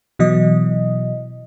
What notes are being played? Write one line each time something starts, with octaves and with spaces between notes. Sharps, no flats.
B2 E3 F#3 D#5